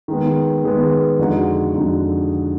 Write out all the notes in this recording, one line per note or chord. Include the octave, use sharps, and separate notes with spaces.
D#3 G#3 B3
D#3 G#3 B3
F2 D3 G#3 D#4 F#4
F2 D3 G#3 D#4 F#4